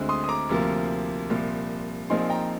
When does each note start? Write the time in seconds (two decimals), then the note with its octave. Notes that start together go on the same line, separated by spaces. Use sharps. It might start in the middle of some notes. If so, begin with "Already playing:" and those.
Already playing: D2 D3 G#3 C4
0.09 C6 D#6
0.24 D#6
0.29 A#5 D6
0.49 D2 C3 F3 A#3
1.29 C2 A#2 F3
2.10 A#1 A#2 F3 C4 D#4 G#5 C6
2.30 G5 A#5